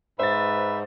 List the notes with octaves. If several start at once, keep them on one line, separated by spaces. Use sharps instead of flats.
G#2 B4 C5 E5 A6